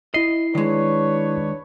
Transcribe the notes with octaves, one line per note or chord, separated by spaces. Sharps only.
E4 D#5 C7
D#3 G#3 D4 B4 C#5